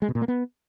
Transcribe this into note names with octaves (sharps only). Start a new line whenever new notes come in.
G#3
B2
A#2
A#3
B3